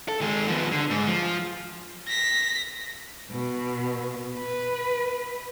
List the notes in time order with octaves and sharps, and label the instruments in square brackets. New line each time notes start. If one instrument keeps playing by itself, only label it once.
[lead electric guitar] A4
D#3 G#3
F3 B3
D3
G#2
F3
[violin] A#6 B6
[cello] B2
B4